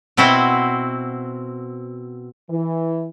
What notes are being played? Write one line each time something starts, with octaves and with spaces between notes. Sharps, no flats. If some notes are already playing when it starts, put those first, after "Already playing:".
B2 C4 E4 F#4 C5
E3